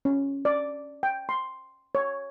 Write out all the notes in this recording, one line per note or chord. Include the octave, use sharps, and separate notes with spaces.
C#4
D5
G5
C6
C#5